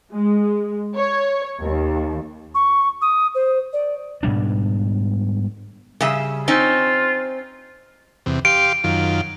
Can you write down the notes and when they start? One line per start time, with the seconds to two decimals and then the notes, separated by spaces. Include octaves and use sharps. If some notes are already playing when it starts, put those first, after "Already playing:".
0.13 G#3
0.97 C#5
1.61 D#2
2.55 C#6
3.02 D#6
3.35 C5
3.73 D5
4.23 G#2 B2 G3 D4
6.01 C#3 G3 E5
6.48 C4 C#4 D#4 F4
8.26 E2 C3
8.45 G4 F5 C6 D7
8.84 F#2 D#3 F4